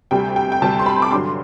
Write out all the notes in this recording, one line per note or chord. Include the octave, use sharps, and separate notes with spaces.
D2 C3 G3 G5
G5
G5
D2 C3 G3 A5
C6
B5
D6
G2 D3 F#3 C6